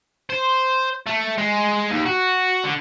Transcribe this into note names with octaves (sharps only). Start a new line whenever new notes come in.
C5
A3
G#3
D#2
F#4
D3